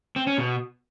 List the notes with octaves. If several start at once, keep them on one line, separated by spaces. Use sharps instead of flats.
C4
C#4
B2